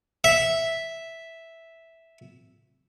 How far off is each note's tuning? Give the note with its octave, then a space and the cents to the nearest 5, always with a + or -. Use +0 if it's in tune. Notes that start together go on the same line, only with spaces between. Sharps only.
E5 -5